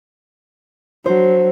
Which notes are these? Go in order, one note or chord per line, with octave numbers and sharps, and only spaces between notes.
F#3 D4 C5